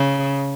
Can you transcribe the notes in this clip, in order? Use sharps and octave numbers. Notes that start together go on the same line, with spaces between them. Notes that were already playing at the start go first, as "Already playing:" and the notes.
Already playing: C#3